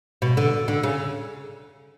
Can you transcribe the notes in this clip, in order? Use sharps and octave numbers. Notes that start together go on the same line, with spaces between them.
B2
D3
D3
C#3